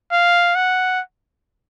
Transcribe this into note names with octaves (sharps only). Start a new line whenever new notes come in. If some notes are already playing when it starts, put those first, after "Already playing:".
F5
F#5